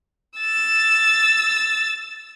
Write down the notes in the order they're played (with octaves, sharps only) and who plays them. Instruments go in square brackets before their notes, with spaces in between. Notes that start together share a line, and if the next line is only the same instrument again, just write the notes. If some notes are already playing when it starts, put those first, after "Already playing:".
[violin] E6 A6